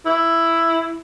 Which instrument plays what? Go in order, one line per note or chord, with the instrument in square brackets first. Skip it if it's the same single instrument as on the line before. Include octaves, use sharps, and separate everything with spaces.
[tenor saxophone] E4